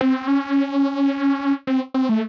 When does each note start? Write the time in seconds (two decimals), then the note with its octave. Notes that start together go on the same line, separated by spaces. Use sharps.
0.01 C4
0.28 C#4
1.67 C4
1.94 C4
2.09 A3